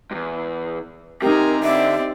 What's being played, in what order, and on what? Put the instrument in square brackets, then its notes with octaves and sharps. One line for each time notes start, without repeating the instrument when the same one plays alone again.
[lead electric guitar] E2 G2
[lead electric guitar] C3 [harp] D#4 G4 [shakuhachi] A#4 [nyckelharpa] G#5 A#5
[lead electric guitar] D3 [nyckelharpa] C4 D5 [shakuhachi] E5